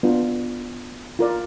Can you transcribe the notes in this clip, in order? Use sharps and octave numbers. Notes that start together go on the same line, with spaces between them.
B3 D4 F4
F4 A#4 D5